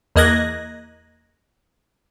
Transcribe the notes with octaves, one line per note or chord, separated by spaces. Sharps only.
E2 A#3 D#5 F#6 G#6 A#6